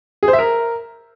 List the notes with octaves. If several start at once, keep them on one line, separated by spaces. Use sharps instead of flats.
G#4
C5
E5
A#4